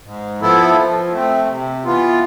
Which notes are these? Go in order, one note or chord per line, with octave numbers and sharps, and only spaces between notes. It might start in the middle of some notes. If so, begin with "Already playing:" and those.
G#2
F3 B3 E4 A4
F3
A3 C4
C3
E3 B3 F4